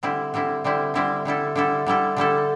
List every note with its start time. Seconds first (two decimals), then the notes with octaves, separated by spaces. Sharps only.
0.03 D3 G3 C4 E4
0.34 D3 G3 C4 E4
0.64 D3 G3 C4 E4
0.94 D3 G3 C4 E4
1.25 D3 G3 E4 A4
1.56 D3 G3 E4 A4
1.86 D3 G3 E4 A4
2.16 D3 G3 E4 A4